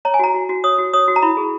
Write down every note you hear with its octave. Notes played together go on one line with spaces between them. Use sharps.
C#5 A#5
G#5
F#4 A#5
F#4
F#4
C#5 D#6
F#4
C#5 D#6
F#4
A#5
E4 B5
G#4